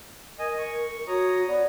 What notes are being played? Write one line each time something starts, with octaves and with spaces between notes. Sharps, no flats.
A#4 D#5 G#5
C#6
F#4 C#5 A#5 D#6
B3 D5